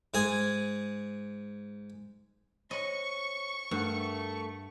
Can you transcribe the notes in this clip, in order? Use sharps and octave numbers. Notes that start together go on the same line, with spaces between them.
G#2 G#4 G#5
C5 C#5 D#5 C#6
G2 A3 A#4 F#5